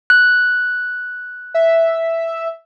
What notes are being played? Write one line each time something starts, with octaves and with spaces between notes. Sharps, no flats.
F#6
E5